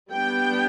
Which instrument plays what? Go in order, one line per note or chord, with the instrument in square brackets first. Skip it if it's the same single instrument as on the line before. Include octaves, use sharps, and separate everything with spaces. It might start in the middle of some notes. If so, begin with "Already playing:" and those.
[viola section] G3 B3 D4 G5